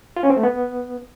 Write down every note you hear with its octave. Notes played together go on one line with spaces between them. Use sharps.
F4
C#4
C4
A3
B3